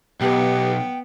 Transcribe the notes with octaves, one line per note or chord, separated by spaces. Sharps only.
B1 B3 G4 G5